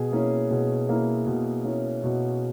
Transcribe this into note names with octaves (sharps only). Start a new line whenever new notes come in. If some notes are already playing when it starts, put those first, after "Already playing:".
Already playing: B2 G#4
A#3 C#4 E4
B2 G#4
A#3 C#4 E4
B2
A#3 C#4 E4
B2 F#4